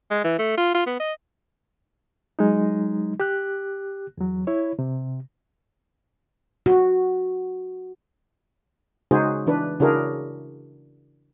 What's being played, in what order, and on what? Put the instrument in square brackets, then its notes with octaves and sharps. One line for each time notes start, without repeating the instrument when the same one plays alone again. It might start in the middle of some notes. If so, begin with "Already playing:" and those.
[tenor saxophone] G#3
E3
A3
F4
F4
B3
D#5
[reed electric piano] F#3 G#3 D#4
G4 F#6
E2 F#3
E4 C#5
C3
[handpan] F#4
[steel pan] C#3 G#3 D#4 F#4 G#4 C5
E3 D4 B4
C#3 D4 E4 F#4 G#4 A#4